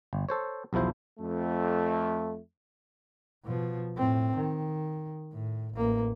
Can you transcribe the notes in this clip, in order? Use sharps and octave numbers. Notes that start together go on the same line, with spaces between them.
G1
A4 C5 C#5
B1 E2 F3 E4 C5
F2 A3
B2 F3
A2 C4
D#3
A2
A1 A#3